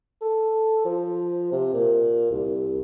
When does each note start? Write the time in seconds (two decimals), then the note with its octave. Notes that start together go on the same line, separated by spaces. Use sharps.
0.22 A4
0.85 F3
1.52 C3
1.74 A#2
2.31 C2